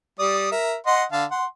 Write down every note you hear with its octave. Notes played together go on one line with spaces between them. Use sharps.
G3 D5 D#6
A#4 E5
D#5 F#5 C6
D3 F5 A5
F#5 C6